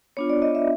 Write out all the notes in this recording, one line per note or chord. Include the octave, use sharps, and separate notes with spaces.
B3 D4 F4 C#5
D5
D#5
E5